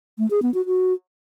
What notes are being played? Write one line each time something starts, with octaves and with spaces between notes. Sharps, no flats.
A3
G#4
B3
F#4
F#4